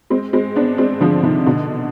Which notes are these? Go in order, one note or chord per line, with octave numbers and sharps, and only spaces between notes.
G#3 C4
G#3 C4
B3 D4
G#3 C4
D3 F3
C3 D#3
B2 D3